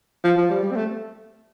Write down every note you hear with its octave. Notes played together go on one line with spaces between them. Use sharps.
F3
F3
G3
G3
C4
A3